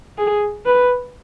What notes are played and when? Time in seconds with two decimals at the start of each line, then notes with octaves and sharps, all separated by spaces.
0.18 G#4
0.66 B4